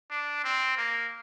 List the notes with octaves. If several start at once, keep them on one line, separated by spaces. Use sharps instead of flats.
D4
C4
A#3